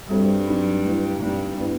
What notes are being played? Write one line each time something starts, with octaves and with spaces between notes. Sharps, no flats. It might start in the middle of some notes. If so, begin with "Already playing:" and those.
G2 G3 C4 F#4 A4 C5
F#3 C4 D#4 F#4
A3 E4 B4
G2 A3 C4 D#4
B3 E4 B4